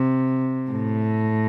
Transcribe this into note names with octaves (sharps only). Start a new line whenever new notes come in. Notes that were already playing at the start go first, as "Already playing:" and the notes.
Already playing: C3
A2